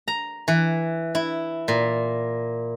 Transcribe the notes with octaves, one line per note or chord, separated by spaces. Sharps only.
A#5
E3
E4
A#2